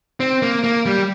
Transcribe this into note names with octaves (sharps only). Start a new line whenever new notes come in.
C4
A#3
A#3
G3